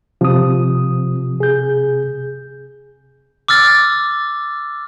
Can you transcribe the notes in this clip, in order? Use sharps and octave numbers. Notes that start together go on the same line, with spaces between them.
C3 F3 D#6
G#4 G6
D6 E6 F6 A6